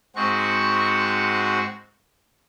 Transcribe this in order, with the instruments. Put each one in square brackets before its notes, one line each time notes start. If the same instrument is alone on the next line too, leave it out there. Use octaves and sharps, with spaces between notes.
[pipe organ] G#2 G#3 C4 F#4 C#6